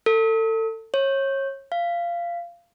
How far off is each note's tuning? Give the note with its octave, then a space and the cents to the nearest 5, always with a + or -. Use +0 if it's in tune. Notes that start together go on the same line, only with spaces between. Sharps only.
A4 +30
C#5 -25
F5 -20